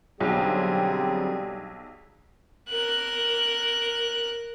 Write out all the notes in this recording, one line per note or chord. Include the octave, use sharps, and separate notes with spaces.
B1 D3 F#3 G3 C4 G#4
A#4 F#6